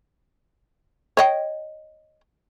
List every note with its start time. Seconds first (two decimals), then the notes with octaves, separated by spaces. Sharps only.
1.17 C#5 D#5 G5